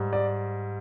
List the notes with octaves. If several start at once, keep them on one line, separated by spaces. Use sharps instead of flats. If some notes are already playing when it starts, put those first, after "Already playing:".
Already playing: G#2 G3
D5